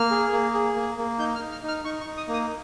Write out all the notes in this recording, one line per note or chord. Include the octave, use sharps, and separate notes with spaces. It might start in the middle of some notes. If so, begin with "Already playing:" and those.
Already playing: A#3 F6
G#4
A#3
G#4
A#3
A#3
D#4 G6
F6
D#4
F6
D#4 F6
D#4 C#6
C#6
D#4
D#6
A#3
D#6